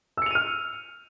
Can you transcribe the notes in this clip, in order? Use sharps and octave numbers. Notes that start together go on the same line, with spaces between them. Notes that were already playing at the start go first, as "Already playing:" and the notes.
E6 F6 C#7 D#7 F7